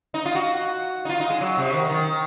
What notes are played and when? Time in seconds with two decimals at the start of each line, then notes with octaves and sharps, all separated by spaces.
0.14 D#4
0.26 F4
0.35 F#4
1.05 D#4
1.09 F4
1.20 D#4
1.30 G#3
1.41 F#3
1.57 C3
1.73 D#3
1.89 D#3